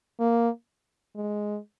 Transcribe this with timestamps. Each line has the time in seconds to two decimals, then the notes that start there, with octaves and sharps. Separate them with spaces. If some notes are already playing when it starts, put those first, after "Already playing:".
0.20 A#3
1.15 G#3